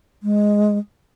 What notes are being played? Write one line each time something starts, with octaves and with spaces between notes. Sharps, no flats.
G#3